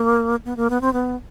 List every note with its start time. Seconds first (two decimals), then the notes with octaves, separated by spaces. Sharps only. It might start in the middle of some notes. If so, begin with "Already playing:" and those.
Already playing: A#3
0.45 B3
0.57 A#3
0.70 B3
0.81 C4
0.93 B3